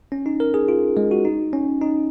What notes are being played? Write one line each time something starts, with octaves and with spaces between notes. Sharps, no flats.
C#4
D#4
A#4
G#4
F4
G#3
F#4
D#4
C#4
D#4